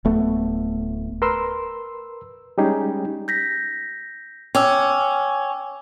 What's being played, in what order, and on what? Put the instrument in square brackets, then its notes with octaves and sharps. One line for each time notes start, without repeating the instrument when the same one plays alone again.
[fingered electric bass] D1 A3 B3
[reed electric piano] A#4 B4 C6 E6
G3 G#3 C#4 D#4 G4 G#4
[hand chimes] G6 A#6 B6
[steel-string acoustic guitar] C#4 [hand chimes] G5 D6 E6